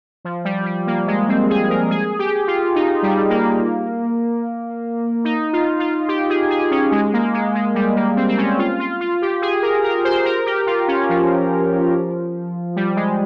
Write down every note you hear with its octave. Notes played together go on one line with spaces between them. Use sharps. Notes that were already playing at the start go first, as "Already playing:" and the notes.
F3
G3
G3
A#3
G#3
C4
G#4
A#4
G#4
G4
F4
D#4
G3
A#3
D#4
F4
F4
G4
G#4
G#4
C#4
G#3
A#3
G#3
G#3
G3
A#3
C4
C4
C#4
F4
F4
F4
G4
G#4
A#4
A#4
C5
A#4
G4
F4
C#4
F3
G3
G#3